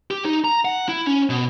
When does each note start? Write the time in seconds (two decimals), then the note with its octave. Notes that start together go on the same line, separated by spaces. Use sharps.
0.11 G4
0.25 D#4
0.44 A#5
0.65 F#5
0.88 E4
1.07 C#4
1.30 B2